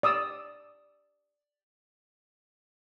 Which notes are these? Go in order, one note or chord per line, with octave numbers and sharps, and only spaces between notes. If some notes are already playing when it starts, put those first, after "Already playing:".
D5 D#6 E6